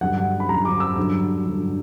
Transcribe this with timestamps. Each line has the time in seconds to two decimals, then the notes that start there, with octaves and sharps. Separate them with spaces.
0.01 G2 D3 F#3 F#5
0.40 B5
0.49 G2 D3 F#3 A#5
0.65 D6
0.80 E6
0.96 G2 D3 F#3
1.46 G2 D3 F#3